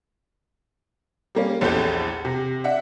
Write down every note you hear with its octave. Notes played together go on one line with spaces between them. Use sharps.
G3 A#3 C#4
A#1 E2 C#4 G4 A4 G6
C3
D4 E5 F#5